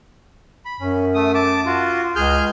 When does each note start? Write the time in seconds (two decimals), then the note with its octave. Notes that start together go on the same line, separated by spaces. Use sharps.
0.65 B5
0.80 F#2 C#4
1.15 A3 D#6
1.35 A5 D6
1.66 F4 F#4
2.16 C#2 G#4 F6 G6